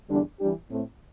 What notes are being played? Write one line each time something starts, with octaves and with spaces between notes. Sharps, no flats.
E2 D3 G3 D4
E3 G3 D4 G4
A2 A3 C4